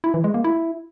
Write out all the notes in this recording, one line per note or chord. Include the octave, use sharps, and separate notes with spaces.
E4
E3
G#3
A#3
E4